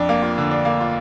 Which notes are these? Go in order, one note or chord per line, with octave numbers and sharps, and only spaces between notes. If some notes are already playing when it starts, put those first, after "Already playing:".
Already playing: F2 D4
A#3
F4
D3
D4
A#3
F4